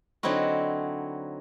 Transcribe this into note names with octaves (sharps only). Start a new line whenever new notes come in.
D3 F#3 C4 D#4 E4 F#4